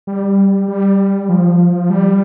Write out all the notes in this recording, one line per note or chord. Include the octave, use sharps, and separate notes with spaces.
G3
G3
F3
G3